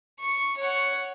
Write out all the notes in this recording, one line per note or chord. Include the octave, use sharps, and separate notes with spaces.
C#6
C#5 F#5